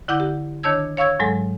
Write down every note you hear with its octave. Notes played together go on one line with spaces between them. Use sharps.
D3 E4 F#5 D6 G6
G4
D#3 D4 C#5 A5 E6 G#6
C#5 F5 C#6 E6 G#6
G#2 F#3 G#3 A4